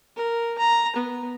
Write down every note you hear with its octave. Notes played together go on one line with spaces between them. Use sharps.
A#4
A#5
B3